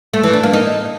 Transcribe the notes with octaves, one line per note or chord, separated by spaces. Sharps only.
A3
E3
D4
A#3
D#4